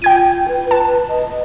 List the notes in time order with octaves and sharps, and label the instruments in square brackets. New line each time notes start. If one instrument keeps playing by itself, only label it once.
[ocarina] F4 [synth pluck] G5 G#6 D#7
[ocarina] B4
[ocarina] B4 [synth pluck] A5
[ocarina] D#5